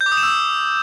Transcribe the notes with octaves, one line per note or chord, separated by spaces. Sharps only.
G6
D6
D#6
E7
E6